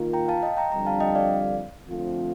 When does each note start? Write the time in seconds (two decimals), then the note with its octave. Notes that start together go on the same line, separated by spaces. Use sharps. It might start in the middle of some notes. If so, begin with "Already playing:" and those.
Already playing: D#3 A#3 F4 A#4
0.13 G5 A#5
0.28 F5 A5
0.43 D#5 G5
0.57 G5 A#5
0.72 F2 D3 G3 D4 G5 A#5
0.87 F5 A5
1.00 D#5 G5
1.15 D5 F5
1.88 D3 F3 A3 C4 F4